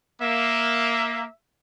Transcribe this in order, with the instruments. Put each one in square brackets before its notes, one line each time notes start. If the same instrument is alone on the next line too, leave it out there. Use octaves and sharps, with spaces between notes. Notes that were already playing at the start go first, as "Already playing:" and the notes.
[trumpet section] A#3 [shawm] E5